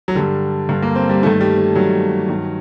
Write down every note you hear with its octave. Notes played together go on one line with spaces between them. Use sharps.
F#3
G2 D3 G3
G2 D3
A#3
C4
G3
G2 D#3 A3
G3
G3
G2 D#3 F#3
G2 D#3